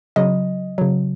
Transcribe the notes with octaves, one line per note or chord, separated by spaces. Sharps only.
C#3 F#3 D#5
C#3 F#3